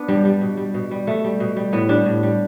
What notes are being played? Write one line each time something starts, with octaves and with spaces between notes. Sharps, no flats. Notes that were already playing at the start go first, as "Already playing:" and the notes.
Already playing: B3 D4
G2 G3
G3
B2
G3
B2
G3
B2 A3
G3
B2
G3
A2 B3
G3 D4
A2
G3